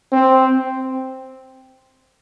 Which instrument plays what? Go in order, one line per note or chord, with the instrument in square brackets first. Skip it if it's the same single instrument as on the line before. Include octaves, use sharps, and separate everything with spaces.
[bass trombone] C4